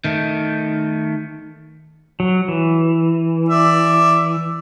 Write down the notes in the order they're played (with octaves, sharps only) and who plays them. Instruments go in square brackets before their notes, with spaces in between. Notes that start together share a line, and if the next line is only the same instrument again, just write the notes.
[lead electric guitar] D#3 A3
[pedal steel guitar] F#3
E3
[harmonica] D5 E5